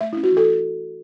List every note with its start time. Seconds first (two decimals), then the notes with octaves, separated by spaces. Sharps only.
0.01 A3 E5
0.13 C#4 E4
0.24 F#4
0.32 E3 A4